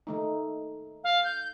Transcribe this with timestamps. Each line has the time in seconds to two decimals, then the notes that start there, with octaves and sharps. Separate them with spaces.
0.07 D#3 A3 D#4
1.03 F5
1.24 G6